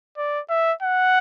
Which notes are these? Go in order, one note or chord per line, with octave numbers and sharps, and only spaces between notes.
D5
E5
F#5